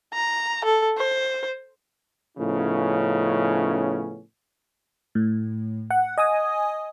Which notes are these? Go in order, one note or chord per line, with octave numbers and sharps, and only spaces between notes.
A#5
A4
C5
A2 C#3 F3 B3 C#4 D#4
A2
F#5
D#5 G#5 D#6